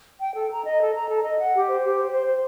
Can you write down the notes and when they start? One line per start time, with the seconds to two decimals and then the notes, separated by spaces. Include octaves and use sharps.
0.20 G5
0.35 A4
0.50 A#5
0.65 D#5
0.80 A4
0.94 A#5
1.09 A4
1.23 D#5
1.38 F#5
1.53 G4
1.68 C5
1.82 G4
1.96 C5
2.12 C5
2.26 C5